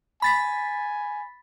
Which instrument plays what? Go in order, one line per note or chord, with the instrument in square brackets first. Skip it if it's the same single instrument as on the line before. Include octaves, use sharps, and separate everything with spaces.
[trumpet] G#5 [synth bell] B5 A6 B6